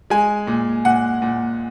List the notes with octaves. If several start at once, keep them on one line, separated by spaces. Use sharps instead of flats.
G#3 G#5
A#2
A#2 F#5
A#2